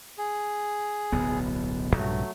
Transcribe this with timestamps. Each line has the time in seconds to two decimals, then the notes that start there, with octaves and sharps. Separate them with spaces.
0.18 G#4
1.12 D1 B1 B3
1.97 A#1 G2 C3 F#3 A3